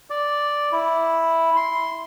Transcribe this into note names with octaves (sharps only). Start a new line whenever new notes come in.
D5
E4
C6